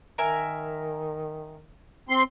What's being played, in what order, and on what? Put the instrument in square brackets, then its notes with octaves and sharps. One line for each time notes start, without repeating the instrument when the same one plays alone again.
[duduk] D#3 [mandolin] A#4 E5 G#5
[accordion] C4 C6